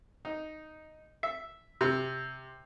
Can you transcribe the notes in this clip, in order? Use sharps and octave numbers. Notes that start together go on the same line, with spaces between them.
D#4
E5
C3